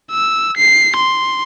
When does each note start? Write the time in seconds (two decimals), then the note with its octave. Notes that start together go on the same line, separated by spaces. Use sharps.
0.11 E6
0.57 C7
0.96 C6